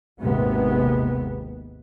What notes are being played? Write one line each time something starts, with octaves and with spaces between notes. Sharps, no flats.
G#1 D#2 C3 G#3 B3